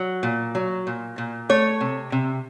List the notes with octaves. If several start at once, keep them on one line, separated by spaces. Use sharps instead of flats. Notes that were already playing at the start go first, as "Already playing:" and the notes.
Already playing: F#3
A#2
F#3
A#2
A#2
A3 C#5
C3
C3